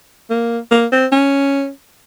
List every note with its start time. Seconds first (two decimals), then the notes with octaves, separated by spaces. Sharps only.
0.30 A#3
0.71 A#3
0.92 C4
1.12 C#4